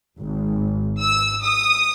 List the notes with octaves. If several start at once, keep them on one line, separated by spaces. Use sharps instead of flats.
G#1
E6
D#6